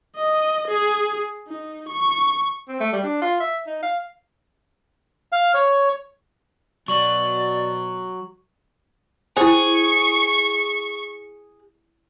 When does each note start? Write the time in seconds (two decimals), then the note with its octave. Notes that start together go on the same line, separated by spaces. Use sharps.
0.16 D#5
0.68 G#4
1.48 D#4
1.89 C#6
2.68 C4
2.80 A3
2.92 G3
3.04 D4
3.21 F4
3.40 E5
3.67 D#4
3.83 F5
5.32 F5
5.54 C#5
6.88 B2 F#3 D5 C#6 F#7
9.37 E4 G#4 C5 C#6